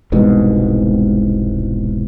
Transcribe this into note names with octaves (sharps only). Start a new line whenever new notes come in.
E1 C2 G#2 B2